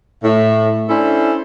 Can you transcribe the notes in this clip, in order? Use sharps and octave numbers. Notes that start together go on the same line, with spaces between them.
A2 E5
C#4 D4 E4 A4 C5 D5